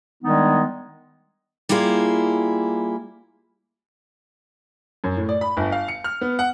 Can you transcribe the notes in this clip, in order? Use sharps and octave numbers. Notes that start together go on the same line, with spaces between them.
D#3 G3 G#3 B3 D4 D#4
G3 A#3 E4 F4 G#4
F#2
A2
D5
B5
G1
F5
C#7
F6
B3
F#5